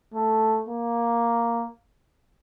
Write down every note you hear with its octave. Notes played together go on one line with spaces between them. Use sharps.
A3
A#3